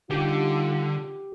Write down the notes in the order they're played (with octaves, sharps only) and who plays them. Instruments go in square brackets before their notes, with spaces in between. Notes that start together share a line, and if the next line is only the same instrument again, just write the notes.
[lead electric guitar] D3 [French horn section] G3 D#4 F4 [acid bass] G4